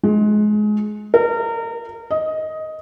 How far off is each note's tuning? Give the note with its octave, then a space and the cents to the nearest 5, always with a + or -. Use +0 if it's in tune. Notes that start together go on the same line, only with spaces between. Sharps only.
G#3 +25
A#4 -30
D#5 +10